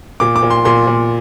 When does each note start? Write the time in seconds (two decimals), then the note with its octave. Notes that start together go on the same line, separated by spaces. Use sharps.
0.20 A#2 D6
0.36 D6
0.43 A#2
0.50 C6
0.65 A#2 C6
0.87 A#2